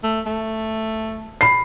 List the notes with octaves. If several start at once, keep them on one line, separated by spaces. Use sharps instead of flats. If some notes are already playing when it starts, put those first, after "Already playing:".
A3
A3
B5 C7